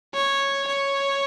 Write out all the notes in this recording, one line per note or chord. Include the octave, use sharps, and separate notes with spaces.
C#5
C#5